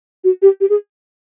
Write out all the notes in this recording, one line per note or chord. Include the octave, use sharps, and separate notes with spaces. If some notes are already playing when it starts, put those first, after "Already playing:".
F#4
G4
G4
G#4